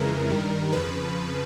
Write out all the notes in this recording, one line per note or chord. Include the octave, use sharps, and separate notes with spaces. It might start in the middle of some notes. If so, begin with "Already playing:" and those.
Already playing: F2 C#3 E3 G#3 A#4
G2 D#3 G3
F2 C#3 F3 B4